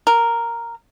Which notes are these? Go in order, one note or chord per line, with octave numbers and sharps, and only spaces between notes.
A#4